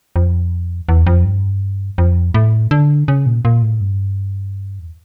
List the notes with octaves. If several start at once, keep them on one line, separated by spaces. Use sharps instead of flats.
F2
E2
F2
G2
F2
A2
D3
C#3
A#2
A#2
A2
G2
E2